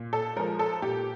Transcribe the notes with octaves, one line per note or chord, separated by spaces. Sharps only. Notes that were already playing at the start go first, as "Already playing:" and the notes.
Already playing: A#2
A4
F3 G#3 A#4
A4
A#2 G4